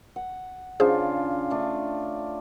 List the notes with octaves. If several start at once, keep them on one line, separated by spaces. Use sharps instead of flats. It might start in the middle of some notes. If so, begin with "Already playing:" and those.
F#5
C#3 D4 F4 G#4 C5
A3 D4